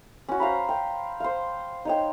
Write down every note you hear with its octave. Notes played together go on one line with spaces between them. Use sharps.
C#4 F#4
C5 F5 A#5 B5
G5
C5 F5
D#4 C#5 G5